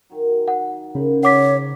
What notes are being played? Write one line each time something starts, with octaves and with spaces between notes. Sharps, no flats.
D#3 F#3
F#5
C#3 A#4 C5 B5
C#5 F#5 D6 B6